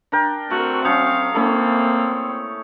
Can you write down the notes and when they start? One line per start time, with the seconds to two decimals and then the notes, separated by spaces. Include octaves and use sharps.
0.12 D4 A#4 G5
0.51 A3 C4 F#4 A#4
0.85 F#3 C#4 F5 D#6 G6 C#7
1.35 A#3 C4 C#4 E4 A4